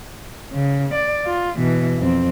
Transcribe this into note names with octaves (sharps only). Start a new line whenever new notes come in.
C#3
D5
F4
B2 E3
F2 C4